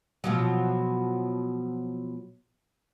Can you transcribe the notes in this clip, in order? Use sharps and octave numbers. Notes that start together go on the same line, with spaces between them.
B2 F3 F#3